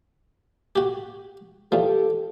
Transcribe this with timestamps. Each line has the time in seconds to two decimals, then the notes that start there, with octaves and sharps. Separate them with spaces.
0.76 F#4 G4
1.72 E2 F3 G4 A4